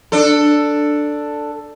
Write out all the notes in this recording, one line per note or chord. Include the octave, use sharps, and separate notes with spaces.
D4 A4